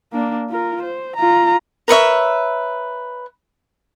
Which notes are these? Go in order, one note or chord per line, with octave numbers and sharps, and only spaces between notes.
A#3 D4
F4 A#4
C5
F4 A#5
A#4 B4 C#5 E5